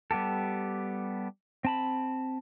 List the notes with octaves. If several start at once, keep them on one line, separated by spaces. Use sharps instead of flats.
G3 B3 G4 A4
C4 A5 B5